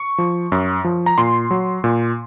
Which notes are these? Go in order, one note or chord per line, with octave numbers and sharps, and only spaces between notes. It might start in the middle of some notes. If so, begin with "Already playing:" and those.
Already playing: C#6
F3
F#2
F3
A#5
A#2 C6
F#3
A#2